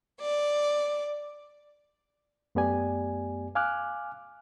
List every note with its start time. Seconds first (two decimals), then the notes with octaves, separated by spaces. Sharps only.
0.21 D5
2.55 F#2 A3 B3 G4 D5 G#5
3.55 F5 G#5 D6 F6 F#6